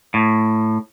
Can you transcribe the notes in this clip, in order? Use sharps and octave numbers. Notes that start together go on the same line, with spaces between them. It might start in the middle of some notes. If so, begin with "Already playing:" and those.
A2